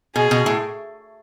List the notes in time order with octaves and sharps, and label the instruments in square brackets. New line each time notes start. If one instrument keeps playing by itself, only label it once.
[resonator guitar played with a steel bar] B2 [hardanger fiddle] G#4
[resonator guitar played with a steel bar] B2
A2